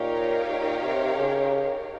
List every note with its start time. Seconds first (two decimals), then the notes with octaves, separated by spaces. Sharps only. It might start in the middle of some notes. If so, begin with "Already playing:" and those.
Already playing: A#2 D#4 G4 A#4 C#5 F5
0.49 A#2
0.82 C3
1.15 C#3